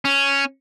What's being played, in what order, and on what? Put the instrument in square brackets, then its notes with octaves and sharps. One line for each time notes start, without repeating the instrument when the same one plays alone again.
[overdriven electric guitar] C#4